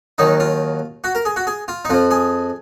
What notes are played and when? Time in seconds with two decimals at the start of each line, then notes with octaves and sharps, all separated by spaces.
0.18 D#2 D#3 F#3 D#4
0.40 F4
1.04 F#4
1.15 A#4
1.25 G#4
1.36 F#4
1.47 G#4
1.68 F4
1.85 D#4
1.90 F2 F3 F4
2.11 G#4